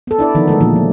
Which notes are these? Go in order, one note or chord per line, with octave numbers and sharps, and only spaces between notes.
B3 A4
D4 E4 D5
D3 D#3 F3 B3 D#4
D3 G#3 A3 A4
A#2 E3 F3 A#3 D4
F#3